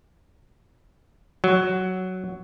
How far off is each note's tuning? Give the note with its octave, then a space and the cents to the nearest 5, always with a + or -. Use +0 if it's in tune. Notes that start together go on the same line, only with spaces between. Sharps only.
F#3 +5